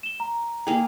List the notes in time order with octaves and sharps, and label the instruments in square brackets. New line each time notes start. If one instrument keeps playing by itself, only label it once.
[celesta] E7 G7
A#5
[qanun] A#3 G#4 [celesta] G5